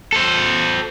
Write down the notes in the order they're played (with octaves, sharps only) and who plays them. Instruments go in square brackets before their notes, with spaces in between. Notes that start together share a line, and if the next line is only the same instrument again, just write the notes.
[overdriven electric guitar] A4 C5